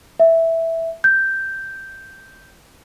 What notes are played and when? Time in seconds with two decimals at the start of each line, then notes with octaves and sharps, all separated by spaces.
0.20 E5
1.04 G6